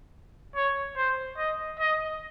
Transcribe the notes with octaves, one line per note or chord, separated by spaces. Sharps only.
C#5
C5
D#5
D#5